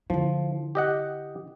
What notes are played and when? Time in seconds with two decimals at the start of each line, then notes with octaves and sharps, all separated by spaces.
0.10 D3 F3 E4
0.75 G4 D#5 F#5